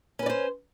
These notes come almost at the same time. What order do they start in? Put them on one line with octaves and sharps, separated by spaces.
C#4 B4 D5 C5